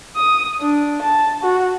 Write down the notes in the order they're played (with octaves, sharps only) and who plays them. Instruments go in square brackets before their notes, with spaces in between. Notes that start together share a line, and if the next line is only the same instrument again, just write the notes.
[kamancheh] D#6
D4
A5
F#4